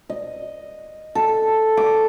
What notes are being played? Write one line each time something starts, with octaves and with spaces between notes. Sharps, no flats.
D#5
A4
D6